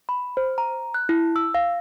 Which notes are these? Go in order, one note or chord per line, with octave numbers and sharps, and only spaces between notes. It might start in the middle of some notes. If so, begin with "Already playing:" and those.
B5
C5
A#5
F#6
E4
E6
F5